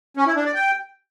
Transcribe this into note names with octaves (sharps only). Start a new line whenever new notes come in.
C#4
E4
D4
D5
G5